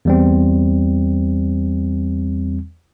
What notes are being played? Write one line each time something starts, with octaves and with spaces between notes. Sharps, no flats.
E2 G3 C4